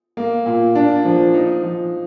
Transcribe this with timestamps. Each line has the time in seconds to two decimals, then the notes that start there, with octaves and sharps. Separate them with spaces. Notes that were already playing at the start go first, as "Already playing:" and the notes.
0.17 A#3
0.46 A#2
0.75 D4
1.05 F3
1.34 D#4
1.63 F3